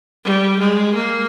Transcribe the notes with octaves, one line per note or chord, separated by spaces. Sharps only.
G3
G#3
A#3